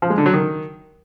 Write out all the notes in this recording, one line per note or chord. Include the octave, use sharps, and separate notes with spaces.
F3
G#3
D3
F#3
D#3